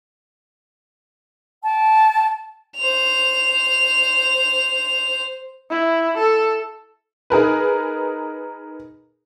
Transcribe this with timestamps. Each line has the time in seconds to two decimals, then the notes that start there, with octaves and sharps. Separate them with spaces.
1.63 G5 A5
2.77 C5 F7
5.70 E4
6.18 A4
7.30 D#4 G#4 A#4 B4